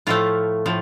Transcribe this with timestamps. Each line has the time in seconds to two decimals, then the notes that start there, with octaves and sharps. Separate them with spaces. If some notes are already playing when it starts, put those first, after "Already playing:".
0.07 A2 F3 A3 F4
0.66 A2 F3